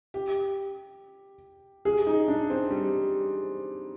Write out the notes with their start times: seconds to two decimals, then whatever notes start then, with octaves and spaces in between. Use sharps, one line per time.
0.14 G4
1.85 G#4
2.07 D#4
2.28 D4
2.50 C4
2.71 G3